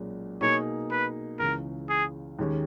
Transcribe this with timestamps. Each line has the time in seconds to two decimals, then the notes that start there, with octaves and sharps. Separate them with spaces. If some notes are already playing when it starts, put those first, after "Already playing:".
Already playing: B1 A#2 G#3 C#4
0.41 B2 A#3 D#4 G#4 C#5
0.91 B4
1.39 C#2 C#3 E3 A#4
1.89 G#4
2.39 D#2 D#3 G#3 C#4 G4